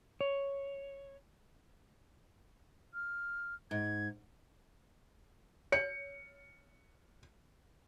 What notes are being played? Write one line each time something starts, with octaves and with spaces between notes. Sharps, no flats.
C#5
F6
G#2 G#6
C#5 C#7